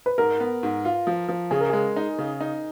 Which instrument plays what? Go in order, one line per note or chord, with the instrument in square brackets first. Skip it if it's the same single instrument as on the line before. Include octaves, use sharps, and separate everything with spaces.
[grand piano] B4
[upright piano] G#2 [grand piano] A#4
[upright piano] B3
G#2
F4
F3
F3
[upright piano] C#3 [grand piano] G#4
[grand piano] A#4
[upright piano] G#3 [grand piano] G#4
[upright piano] D#4
C#3
D#4